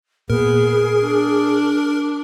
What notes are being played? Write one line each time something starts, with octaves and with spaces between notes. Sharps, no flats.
A#2 B3 G#4 A#4
D4